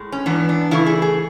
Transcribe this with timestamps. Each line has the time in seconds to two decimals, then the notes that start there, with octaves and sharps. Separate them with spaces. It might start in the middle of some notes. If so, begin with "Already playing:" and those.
Already playing: A2 G#3
0.12 C#4
0.26 G#2 E3 B3 D4
0.49 D4
0.71 C#3 E3 A3 E4
0.86 G#4
1.02 G#4